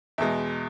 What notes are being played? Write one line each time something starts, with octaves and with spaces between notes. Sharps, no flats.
E2 B2 G#3 E5